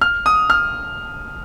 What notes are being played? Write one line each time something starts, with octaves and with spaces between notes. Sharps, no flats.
F6
D#6
F6